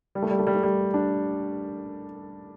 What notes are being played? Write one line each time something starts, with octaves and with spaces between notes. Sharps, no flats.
G3
A3
G3
A3
G3
A3
G3
D4